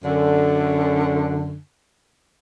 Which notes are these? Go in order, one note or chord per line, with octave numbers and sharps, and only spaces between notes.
F#2 D3